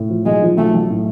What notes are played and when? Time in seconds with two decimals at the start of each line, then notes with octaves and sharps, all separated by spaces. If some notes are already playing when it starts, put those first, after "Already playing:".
Already playing: A2
0.09 F3
0.25 B1 G#3
0.42 F3
0.57 B1 A3
0.74 B1
0.90 A2